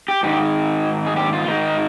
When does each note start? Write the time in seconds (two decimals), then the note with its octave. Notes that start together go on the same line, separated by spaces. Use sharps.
0.08 G4
0.23 G#2 D#3 G4
1.07 G#4
1.16 G4
1.33 F4
1.48 G#2 D#3 D#4